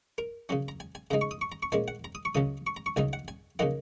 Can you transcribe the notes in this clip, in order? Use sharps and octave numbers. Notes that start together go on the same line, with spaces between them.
A#4
C#3 F#3 C#4
A#5
G#5
G#5
C#3 G#3 D#4 A#5
C#6
D#6
C#6
A#5
C#6
A#2 G#3 C#4 G#5
F#5
A#5
D#6
C#6
C#2 C#3 F#3 C#4 D#6
C#6
A#5
C#6
C#2 C#3 F#3 D#4 G#5
F#5
G#5
C#3 F#3 A#3 D#4 F#5